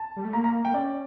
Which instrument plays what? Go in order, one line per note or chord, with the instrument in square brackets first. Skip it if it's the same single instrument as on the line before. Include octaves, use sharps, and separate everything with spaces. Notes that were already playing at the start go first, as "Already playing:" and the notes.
Already playing: [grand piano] A5
[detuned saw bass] G3
A3
[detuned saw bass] A#3 [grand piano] A#5
[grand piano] A#5
[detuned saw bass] A#3 [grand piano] G5
[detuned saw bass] C#4 [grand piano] D5